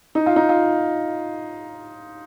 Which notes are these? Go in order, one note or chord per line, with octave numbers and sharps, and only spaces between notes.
D#4
F4
D#4
F4